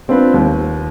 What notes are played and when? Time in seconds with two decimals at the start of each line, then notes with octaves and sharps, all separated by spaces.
0.08 B3 C4 D4 F4 B4
0.34 D#2